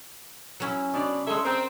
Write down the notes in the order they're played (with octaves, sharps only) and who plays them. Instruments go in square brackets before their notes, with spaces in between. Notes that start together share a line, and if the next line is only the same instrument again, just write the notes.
[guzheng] F#3 C#4 E4
[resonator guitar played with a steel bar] B2 D4 D5
[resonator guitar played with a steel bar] G#3 G#4 A4 [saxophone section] C#5 E5
[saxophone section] C4 [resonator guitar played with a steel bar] A#4